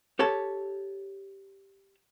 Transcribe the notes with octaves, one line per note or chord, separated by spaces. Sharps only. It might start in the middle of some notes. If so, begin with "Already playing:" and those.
G4 A4 C#5 A5